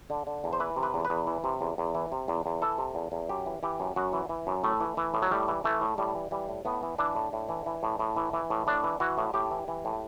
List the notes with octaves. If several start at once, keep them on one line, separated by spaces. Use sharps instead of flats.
D3
D3
E2
C5
E3 B4
C3
B4
E2
B4
E2
E3
C3
E2
E2
E3
C3
E2
E2
E3 A4
C3
E2
E2
F#2 G4
E3
E3 G4
F#2
F#2 F#4
E3
E3
F#2
A2 A3
E3
E3
A2
F#3
A2 G3
E3
E3 A3
A2
A2 G3
E3
E3 G3
A2
A2 B3
E3
E3 D4
A2
A2
E3
E3
A2
A2
E3
E3
A2
A2 D4
E3
E3 F#4
A2
A2 G4
E3
E3
A2